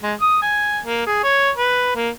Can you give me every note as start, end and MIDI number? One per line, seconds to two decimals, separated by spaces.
0.03 0.14 56
0.21 0.38 87
0.42 0.79 80
0.84 1.04 58
1.07 1.22 68
1.23 1.50 73
1.56 1.94 71
1.95 2.10 58